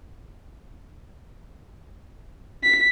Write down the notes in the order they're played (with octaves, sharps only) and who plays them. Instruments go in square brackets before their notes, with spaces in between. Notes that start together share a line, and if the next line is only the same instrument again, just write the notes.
[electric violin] B6